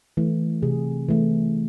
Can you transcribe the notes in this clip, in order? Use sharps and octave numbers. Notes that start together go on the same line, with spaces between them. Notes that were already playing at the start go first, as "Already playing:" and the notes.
E3 A3
C3 G#4
E3 A3